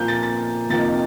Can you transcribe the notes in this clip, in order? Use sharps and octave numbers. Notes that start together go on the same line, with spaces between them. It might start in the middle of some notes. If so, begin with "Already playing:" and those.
Already playing: A#2 F3 A#3 G6
A6
A6
F2 C3 F3 A#3 D#4 A6